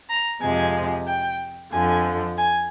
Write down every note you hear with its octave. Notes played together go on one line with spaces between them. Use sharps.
A#5
F2 C3 F3 G#3 G#5
G5
F2 D3 F3 G#5
G#5